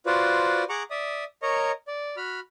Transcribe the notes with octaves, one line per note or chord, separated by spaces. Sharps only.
F4 F#4 B4 C5 D5
G#4 F#5 A#5 C#6 D6
D5 E5 D#6
A#4 C#5 D#5 A#5 C#6
D5
F#4 B5 F6